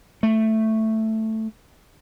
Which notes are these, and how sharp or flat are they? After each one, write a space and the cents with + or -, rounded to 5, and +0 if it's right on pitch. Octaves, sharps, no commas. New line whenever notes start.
A3 +5